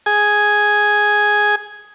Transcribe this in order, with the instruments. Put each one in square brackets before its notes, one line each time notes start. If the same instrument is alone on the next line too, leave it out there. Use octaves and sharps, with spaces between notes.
[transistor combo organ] G#4 G#5